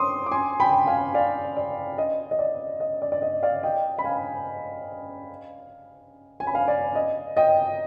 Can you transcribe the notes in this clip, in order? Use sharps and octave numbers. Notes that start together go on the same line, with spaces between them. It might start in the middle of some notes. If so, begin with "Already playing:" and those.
Already playing: C6 D6 D#6
D6
G#5 C6
G5 B5
F5 G#5
D5 F5
D5
D#5
D#5
D5
D#5
D5
D5
D#5
D5 F5
D#5 G5
B5
F5 G#5
G#5
B5
F5 G#5
D5
D#5
D#5 G5